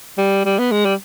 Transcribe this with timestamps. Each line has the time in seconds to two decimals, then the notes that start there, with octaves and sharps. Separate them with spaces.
0.18 G3
0.45 G3
0.58 B3
0.71 G#3
0.85 G3